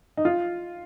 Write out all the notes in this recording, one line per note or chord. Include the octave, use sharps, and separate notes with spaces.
D#4
F4